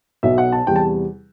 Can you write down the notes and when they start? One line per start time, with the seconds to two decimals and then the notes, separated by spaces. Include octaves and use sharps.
0.23 B1 B2 F#3 E5
0.38 F#5
0.52 A5
0.67 E2 C3 G3 G5
0.76 A5